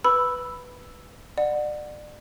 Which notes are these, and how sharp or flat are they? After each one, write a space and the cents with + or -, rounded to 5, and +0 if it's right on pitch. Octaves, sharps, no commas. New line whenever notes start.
B4 +0 B5 +0 E6 +0
D5 +30 F#5 -10